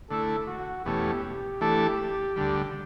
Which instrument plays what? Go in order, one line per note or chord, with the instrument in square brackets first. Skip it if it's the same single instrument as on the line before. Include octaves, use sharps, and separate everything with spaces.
[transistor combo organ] D3 A3 E4 [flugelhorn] A4
[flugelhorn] F#4
[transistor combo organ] E2 B2 A3 C#4 [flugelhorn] G4
[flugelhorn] G4
[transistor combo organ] E3 A3 D4 A4
D2 D3 G3